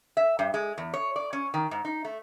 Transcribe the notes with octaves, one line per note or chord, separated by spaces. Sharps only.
E5
G2
G#3
E2
C#5
D5
C#4
D#3
G#2
D#4
A3